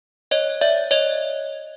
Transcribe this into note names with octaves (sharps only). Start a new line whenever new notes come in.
C#5 D#5
D5 E5
C#5 D#5